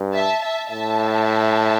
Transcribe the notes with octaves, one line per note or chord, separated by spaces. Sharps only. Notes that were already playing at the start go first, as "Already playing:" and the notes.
Already playing: G2
E5 A5
E5 A5
A2 E5 A5